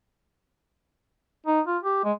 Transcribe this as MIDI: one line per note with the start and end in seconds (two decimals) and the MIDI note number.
1.46 1.61 63
1.67 1.78 65
1.83 1.99 67
2.04 2.12 56